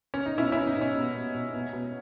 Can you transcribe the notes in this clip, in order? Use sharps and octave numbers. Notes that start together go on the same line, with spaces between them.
C#4
D#4
B2 C#4 E4
B2 C#4 E4
D#4
B2
C#4
B2
B2
B2
B2
B2